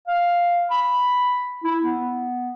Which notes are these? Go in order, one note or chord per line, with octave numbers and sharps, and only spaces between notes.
F5
B5
E4
B3